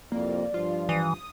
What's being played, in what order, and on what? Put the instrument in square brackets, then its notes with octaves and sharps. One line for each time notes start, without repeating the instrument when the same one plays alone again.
[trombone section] C2 F2 [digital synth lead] A#3 [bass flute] D5
[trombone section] G2 F3 [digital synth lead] F4
[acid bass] E3 [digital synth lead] D#6